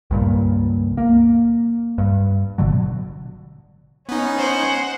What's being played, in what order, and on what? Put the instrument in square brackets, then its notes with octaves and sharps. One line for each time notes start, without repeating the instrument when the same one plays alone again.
[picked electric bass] C#2 G2 A#2
A#3
G2
G1 B2 D3 F#3
[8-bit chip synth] B3 D#4 [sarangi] C#4
[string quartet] C5 F#5